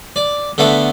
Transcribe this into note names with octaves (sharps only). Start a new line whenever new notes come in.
D5
D3 A3 B3 F#5 B5